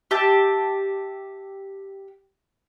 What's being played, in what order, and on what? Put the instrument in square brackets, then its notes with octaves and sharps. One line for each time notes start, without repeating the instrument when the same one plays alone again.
[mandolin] G4 E5 A5